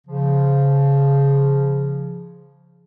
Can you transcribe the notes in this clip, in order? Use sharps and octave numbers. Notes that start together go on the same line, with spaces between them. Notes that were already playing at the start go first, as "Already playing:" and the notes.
C#3 F3